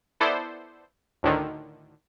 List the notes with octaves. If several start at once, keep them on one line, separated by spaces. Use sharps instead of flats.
B3 E4 A4 C5 D5
D2 A2 D3 D#3